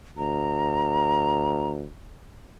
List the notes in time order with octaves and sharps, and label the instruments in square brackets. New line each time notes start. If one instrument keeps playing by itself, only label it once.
[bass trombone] D2 [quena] A#5